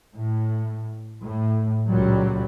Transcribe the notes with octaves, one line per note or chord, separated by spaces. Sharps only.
A2
A2
C#2 A#2 F#3 G3